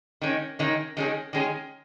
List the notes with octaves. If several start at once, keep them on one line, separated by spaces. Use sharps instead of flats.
D#3 G#3 C#4
D#3 G#3 C#4
D#3 G#3 C#4 G#4
D#3 G#3 C#4 G#4